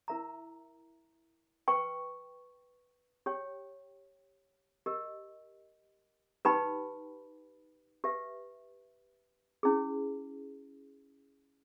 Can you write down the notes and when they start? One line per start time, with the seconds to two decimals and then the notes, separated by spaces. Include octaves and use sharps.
0.08 E4 A#4 E5 A#5
1.68 B4 G5 C#6
3.26 G4 C#5 G5
4.86 G4 A#4 D#5
6.45 D#4 G4 B4 G5 B5
8.04 G4 B4 E5
9.63 C#4 E4 G#4